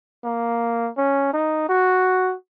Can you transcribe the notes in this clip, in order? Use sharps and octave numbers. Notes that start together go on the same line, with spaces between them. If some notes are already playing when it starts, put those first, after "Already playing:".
A#3
C#4
D#4
F#4